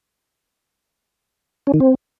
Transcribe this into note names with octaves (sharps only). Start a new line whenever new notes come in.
C#4
D#3
C4